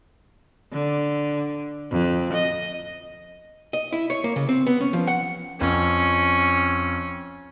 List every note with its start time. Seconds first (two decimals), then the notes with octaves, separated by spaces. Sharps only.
0.73 D3
1.91 F2
2.33 D#5
3.73 D#5
3.93 E4
4.10 C#5
4.24 A#3
4.36 C#3
4.49 C4
4.67 B3
4.81 C#4
4.93 F3
5.07 F#5
5.61 F2 C#4